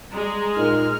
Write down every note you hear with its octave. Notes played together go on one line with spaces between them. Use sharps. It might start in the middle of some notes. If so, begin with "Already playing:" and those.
G3 G#3 A#5
A#2 D#4 F6